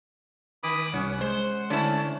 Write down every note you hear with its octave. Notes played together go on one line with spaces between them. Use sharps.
D#3 B5 D6 D#6
C2 C#4 F#5
G#3 C5
D3 A3 C#4 E4 A5